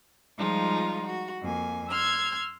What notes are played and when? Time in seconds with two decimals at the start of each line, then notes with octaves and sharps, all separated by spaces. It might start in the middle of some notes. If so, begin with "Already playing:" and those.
0.37 F3 G3 G#3 D#4 F4
1.07 F#4
1.41 F2 A#3 G#5
1.89 C6 E6 F6 G#6